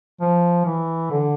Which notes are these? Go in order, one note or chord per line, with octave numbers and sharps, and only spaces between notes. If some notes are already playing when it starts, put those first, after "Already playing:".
F3
E3
D3